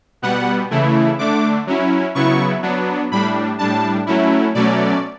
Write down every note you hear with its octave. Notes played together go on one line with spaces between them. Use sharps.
B2 G3 B3 F#5
C#3 E3 A3 E4
D3 A3 D4 D6
F#3 C#4 E4
C#3 F#3 B3 E4 C#6
F#3 B3 D4
A2 G3 D4 B5
A2 G3 D4 A5
F#3 A3 C#4 E4
B2 F#3 A3 C#4 D5